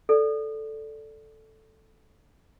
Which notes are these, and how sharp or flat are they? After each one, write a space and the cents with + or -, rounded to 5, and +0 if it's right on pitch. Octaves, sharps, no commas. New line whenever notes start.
A4 +0 D5 -5